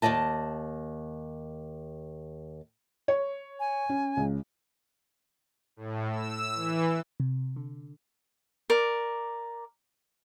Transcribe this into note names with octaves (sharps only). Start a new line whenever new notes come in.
D#2 D#3 D5 D#5 A5
C#5
G#5
C#4
C#2
A2
E6
E3
C3
D3
A#4 D5